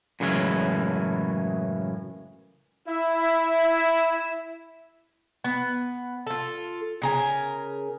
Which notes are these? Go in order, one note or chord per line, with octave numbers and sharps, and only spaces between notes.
F#2 A2 C#3 E3 G#3
E4 E5
B3
F4 A4
C#3 A#4 G#5